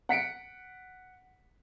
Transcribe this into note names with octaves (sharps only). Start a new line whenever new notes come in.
F#5 B6 C#7 D7